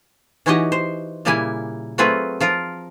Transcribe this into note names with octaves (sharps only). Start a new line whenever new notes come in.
E3 C#4 D#4 F#4 G4 D#5
C5
A#2 C#3 G3 A#3 E4 G#5
F#3 A3 C4 F4 G#4 B4
F3 F4 A#4